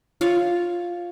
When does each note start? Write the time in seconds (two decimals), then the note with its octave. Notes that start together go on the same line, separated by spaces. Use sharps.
0.21 F4 C#5 F5